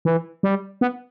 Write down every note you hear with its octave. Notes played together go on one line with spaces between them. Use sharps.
E3
G3
B3